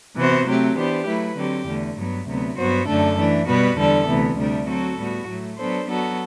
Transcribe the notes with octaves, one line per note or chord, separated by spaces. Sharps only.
C3 E3 B3 F#4 C5
C3 F#3 A3 C4 G4
E3 B3 D4 G4 C5
F#3 A3 E4 B4
D3 F#3 C4 G4
E2 D3 A3
G2 F#3 B3
D2 C3 F#3 B3
G2 F#3 B3 F#4 C5
F#2 D3 A3 D4 A4
E3 A3 D4
B2 G3 B3 F#4 B4
E2 D3 G3 D4 A4
D2 C3 E3 B3
D2 C3 G3 D4
F#3 C4 F#4 A4
A2 G3 B3 F#4
A2 F#3 A3
F#3 B3 D4 A4 C5
F#3 B3 F#4 A4